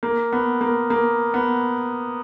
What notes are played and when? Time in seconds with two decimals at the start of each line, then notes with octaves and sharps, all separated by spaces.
0.03 A#3
0.33 B3
0.61 A#3
0.90 A#3
1.34 B3